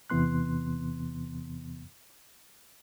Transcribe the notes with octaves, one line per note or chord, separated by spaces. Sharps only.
E2 C3 E3 B3 C6 F#6